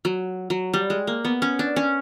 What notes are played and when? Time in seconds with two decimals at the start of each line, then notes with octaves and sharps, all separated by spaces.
0.05 F#3
0.50 F#3
0.74 G3
0.90 G#3
1.07 A#3
1.25 B3
1.42 C#4
1.59 D4
1.76 C#4